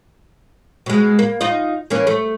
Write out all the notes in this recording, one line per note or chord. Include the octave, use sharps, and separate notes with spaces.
B2 G#3
A#3
D#4 F4 D#5
E3 A#3 C#4
A3